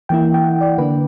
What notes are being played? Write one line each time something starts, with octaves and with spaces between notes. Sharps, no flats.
E3 A#3 E4 G5
G5
F#5
D5
D3 A#3 D4 B4